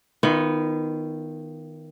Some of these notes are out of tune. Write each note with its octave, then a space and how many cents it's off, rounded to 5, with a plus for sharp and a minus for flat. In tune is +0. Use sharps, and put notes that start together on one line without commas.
D#3 +0 B3 +0 F4 -40